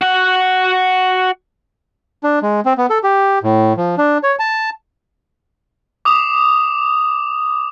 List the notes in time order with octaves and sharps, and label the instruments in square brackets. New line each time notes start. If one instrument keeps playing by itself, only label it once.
[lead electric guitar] F#4 F#5
[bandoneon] D4
G#3
C4
B3
A4
G4
A2
F3
D4
C#5
A5
[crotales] D6 D#6 F7